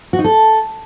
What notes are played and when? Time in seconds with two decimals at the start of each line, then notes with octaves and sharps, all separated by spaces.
0.13 F#4
0.19 D#4
0.24 A4